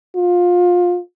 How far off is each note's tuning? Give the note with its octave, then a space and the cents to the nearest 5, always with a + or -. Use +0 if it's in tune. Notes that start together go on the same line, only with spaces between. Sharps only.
F4 +20